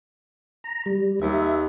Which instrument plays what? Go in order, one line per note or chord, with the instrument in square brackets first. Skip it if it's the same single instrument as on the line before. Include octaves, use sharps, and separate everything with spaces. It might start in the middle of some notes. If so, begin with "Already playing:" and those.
[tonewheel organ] A#5
G3
[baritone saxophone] D#2 [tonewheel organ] E5